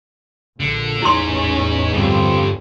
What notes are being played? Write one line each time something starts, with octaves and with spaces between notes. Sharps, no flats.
A#1 A#2 D3
A1 E2 G#3 C#4 D#4 E4 C6
G2 D3 F3 G3 C4